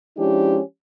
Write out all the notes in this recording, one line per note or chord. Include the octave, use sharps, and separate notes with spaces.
F3 G#3 C#4 D4 E4 G4